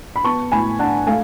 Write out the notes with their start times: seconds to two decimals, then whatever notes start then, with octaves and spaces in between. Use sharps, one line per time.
0.16 B5
0.24 B3 A5 C#6
0.52 A2 G#5 B5
0.79 D4 F#5 A5
1.07 A3 F5 G#5